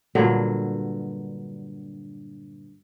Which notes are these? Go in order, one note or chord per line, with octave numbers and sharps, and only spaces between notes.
G2 A#2 D3 F#3